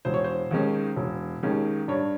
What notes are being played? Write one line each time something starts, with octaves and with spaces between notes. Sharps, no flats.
E1 C5
C#5
C5
D#2 D#3 G#3 C#4
E1
D#2 D#3 G#3 C#4
G2 C#5